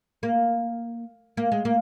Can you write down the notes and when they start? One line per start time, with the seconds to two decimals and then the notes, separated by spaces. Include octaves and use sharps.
0.23 A#3
1.37 A#3
1.52 G#3
1.65 A#3